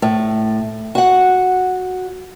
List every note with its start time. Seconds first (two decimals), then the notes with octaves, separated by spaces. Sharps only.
0.02 A2
0.95 F#4 F#5